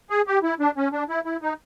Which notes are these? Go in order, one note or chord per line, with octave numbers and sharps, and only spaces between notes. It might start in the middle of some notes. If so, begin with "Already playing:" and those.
G#4
G4
E4
D4
C#4
D4
E4
E4
D#4